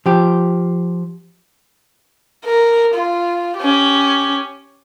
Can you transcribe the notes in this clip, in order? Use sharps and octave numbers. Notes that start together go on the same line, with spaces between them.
F3 G4
A#4
F4
C#4 G4